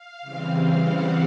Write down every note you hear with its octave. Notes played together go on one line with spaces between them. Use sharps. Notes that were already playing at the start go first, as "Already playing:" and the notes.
Already playing: F5
C#3 E3 G3 C4
F#5